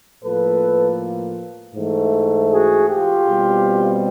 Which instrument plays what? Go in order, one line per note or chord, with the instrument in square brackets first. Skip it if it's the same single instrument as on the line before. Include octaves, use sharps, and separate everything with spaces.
[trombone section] A2 F3 A#3 A4 B4
G#2 E3 A3
F#4 G#4
F4 G4
B2 G3 C4